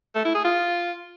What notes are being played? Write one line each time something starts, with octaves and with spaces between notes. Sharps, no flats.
A3
E4
G#4
F4